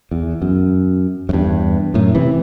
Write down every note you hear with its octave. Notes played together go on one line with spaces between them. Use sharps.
E2
F#2
F#2
E2 G2
F#2 A2
C3 E3